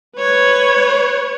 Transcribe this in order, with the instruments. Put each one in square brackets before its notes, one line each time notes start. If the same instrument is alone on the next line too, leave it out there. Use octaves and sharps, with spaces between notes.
[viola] B4 C#5